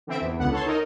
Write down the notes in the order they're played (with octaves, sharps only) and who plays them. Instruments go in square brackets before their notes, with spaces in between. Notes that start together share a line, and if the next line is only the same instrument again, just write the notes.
[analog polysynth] D3 E3 C4 E5 D7
E2
C#2 D3 B3 F#5
A4 C#5 A5 C6
D#4 A#4 D#5